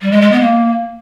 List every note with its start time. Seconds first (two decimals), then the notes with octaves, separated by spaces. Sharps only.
0.02 G3
0.12 G#3
0.22 G#3
0.32 B3
0.42 A#3